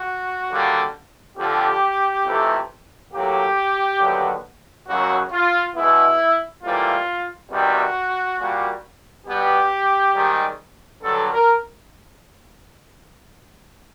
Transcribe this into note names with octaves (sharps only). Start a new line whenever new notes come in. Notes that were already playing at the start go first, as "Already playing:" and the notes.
Already playing: F#4
D#2 D3 G3 A#3
F2 D3 F3 G4
F2 C3 E3 A3
A2 F#3 A#3 G4
D#2 D3 F#3 B3
D#2 C#3 F#3 A#3 F#4
F4
B2 G#3 B3 E4
A2 E3 G3 A#3 F4
E2 C3 D#3 G3 F#4
A#2 G3 A#3
B2 G3 B3 G4
G#2 D#3 G3
G2 D3 F#3 A4
A#4